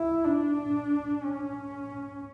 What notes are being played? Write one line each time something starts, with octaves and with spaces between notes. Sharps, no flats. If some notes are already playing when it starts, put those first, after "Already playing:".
Already playing: E4
D4
C#4